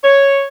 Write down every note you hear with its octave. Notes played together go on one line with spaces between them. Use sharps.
C#5